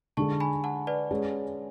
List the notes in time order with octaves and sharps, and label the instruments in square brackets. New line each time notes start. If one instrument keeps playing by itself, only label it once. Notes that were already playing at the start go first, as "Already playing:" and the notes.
[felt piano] D3 G#3 D4 G#4 [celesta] A5 C#6
[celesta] G#5 B5
F#5 A5
B4 D5
[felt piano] G#3 C#4 G#4